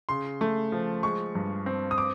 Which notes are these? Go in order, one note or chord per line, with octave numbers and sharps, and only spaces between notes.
C#3 C6
A3
F3
G#3 C#6
G2
C4
D#6
D6